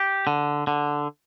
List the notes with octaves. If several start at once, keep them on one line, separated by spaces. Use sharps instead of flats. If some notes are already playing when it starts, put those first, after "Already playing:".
Already playing: G4
D3
D3